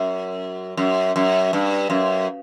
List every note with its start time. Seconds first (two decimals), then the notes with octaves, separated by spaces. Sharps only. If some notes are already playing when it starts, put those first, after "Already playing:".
Already playing: F#2
0.77 F#2
1.16 F#2
1.53 G2
1.90 F#2